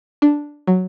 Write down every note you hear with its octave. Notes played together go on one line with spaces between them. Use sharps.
D4
F#3